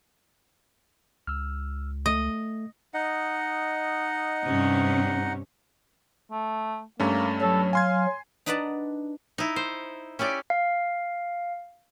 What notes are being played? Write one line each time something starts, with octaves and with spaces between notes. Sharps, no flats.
C#2 E6 F6
A3 D#5
D#4 D#5 F#5
G2 C3 C#4
A3
G2 A3 A#3 C#4
F#3 A4
F5 G#5 C6 G#6
D4 D#4 B4 D5 F#5 A5
D#4 E4
C5
C#4 E4 G4 D5
F5